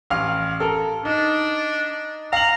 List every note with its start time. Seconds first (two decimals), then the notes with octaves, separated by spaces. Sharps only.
0.10 A1 F5 F6
0.60 A4 A#4
1.05 D4 D#4
2.33 F5 A#5 F#7